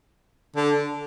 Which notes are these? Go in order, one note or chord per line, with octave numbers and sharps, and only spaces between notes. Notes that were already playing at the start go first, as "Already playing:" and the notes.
D3